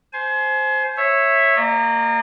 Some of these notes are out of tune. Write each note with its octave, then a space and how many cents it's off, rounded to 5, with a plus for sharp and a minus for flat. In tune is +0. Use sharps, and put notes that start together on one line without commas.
C5 +0 G#5 +35
C#5 -15 E5 +0
A#3 -15 D#5 -45